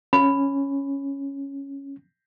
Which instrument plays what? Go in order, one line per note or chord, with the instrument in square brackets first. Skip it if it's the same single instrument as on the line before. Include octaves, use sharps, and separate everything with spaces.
[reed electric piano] C#4 [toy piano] B5